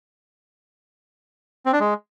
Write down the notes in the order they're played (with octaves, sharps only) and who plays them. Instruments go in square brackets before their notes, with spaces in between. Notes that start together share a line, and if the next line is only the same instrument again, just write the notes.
[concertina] C4
D4
G#3